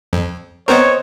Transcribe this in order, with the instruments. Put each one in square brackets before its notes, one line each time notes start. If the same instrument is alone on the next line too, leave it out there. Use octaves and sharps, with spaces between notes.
[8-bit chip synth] F2
[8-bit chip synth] B3 C4 A#4 [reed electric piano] C5 D#5 [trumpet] C#5